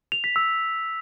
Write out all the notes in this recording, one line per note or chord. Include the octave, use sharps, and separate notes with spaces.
F7
B6
E6